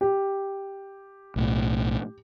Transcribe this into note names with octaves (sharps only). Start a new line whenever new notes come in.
G4
B1 A2